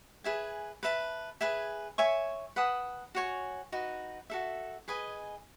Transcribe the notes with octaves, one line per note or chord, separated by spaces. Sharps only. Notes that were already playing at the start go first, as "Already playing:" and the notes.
G#4 B4 E5 G#5
B4 E5 A5
G#4 B4 E5 G#5
C#5 E5 G#5 C#6
B4 F#5 A5 D#6
F#4 C#5 G#5
D#4 F#4 B4
F#4 A4 E5
G#4 B4 D#5 G#5